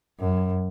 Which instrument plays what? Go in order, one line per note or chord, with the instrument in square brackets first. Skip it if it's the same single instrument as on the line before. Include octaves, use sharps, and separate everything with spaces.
[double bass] F#2